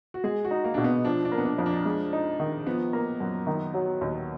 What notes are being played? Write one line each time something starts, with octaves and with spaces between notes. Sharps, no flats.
F#4
G#3 G#4
F#4
D#4
A#3
B2 D4
B3
F3 D4
D4
A#3
B3
D4
F2
D4
G#3
D#4
D#3
F3 B3
A#3
F#2
D#3
F#3
D#2